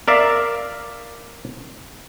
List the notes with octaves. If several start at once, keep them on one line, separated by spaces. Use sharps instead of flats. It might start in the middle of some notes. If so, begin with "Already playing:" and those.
A#4 D5 E5 F5